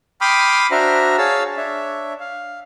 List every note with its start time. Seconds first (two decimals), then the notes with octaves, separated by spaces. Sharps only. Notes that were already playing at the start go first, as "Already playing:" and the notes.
0.21 G5 B5 C6 D6 D#6 F6
0.71 D4 F#4 C5 E5 A#5 F6
1.18 G#4 C#5 F5 A5 E6
1.57 D4 C#5 E5
2.20 F5